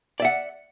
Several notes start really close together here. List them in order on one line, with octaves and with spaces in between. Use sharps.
D5 E5 F#5